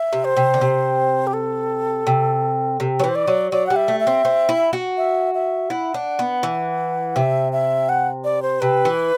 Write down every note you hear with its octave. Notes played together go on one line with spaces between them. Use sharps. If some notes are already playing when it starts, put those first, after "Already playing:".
Already playing: E5
C3
C5
C3
D3
C3
G4
A4
C3
C3
F#3 B4
E3 C5
D5
F#3
F#3 D5
G3 F#5
E5
A3
E5
C4
C4
E4
F#4
E5
E5
E4 F#5
D4
B3
E3
C3 E5
E5
F#5
D5
C5
C3 B4
E3